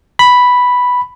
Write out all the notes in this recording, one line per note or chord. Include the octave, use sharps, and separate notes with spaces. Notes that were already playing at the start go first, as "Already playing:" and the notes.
B5